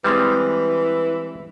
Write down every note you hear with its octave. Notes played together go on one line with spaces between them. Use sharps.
E3 G3 G#3 C4